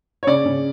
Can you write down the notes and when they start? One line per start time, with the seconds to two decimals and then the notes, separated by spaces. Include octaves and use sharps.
0.23 C#5
0.27 C#3 D5
0.46 C#3